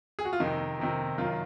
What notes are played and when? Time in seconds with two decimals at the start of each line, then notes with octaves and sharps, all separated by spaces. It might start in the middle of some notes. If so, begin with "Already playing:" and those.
0.19 G#4
0.25 F#4
0.33 F4
0.40 F2 C3 D#3 D#4
0.79 F2 C3 D#3
1.18 F#2 D#3 F4